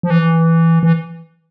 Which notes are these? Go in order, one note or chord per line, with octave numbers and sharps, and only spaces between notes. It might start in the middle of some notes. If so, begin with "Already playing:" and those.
F3
E3
E3